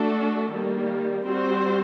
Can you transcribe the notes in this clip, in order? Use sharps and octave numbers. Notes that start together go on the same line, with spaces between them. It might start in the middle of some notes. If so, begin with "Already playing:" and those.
Already playing: A3 D4 F#4 A4
D#3 G3 A#3
G3 C4 F#4 C5